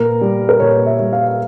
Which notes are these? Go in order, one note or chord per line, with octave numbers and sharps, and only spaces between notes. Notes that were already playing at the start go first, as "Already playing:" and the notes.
Already playing: A#2 A#4
G3
A#4
A#2 C#5
E5
G3
F5
F5